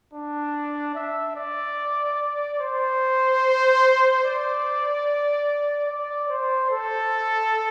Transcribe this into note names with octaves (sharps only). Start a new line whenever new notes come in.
D4
E5
D5
C5
D5
D5
C5
A4